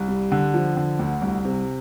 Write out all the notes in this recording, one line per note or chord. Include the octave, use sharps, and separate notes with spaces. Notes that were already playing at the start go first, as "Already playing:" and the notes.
Already playing: C2
G3
D3
F3
D3
D2
C2
C3